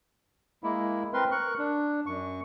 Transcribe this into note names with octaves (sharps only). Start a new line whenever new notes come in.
G#3 A#3 E4
C4 A#4 B4 C6
A#4 C#6 F#6
D4
F#2 C#6